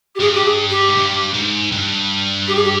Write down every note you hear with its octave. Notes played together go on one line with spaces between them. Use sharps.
G4
G2 G#4
G4
G#4
G4
G#2
G2
G#2
G2
G4
G#4
G4